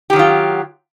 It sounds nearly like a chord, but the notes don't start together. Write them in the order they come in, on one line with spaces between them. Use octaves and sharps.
G4 D#3 F#3 F4